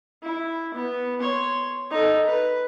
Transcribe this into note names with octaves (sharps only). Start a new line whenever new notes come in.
E4
B3
C#5 C6
D#4 A4
B4